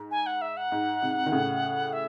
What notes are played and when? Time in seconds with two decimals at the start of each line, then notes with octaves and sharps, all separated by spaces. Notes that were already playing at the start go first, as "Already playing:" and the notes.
Already playing: G#2
0.11 G#5
0.26 F#5
0.41 E5
0.57 F#5
0.72 G#2
1.02 G#2 C3
1.26 D#3
1.32 A2 C#3
1.93 E5